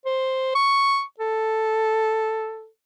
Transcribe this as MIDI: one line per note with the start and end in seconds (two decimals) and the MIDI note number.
0.05 0.54 72
0.55 1.04 85
1.19 2.68 69